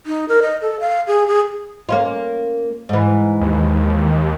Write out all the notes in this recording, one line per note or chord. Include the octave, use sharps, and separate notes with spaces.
D#4
A#4
D#5
A4
F5
G#4
G#4
A#3 C#4 F4
G#2 E3
D#2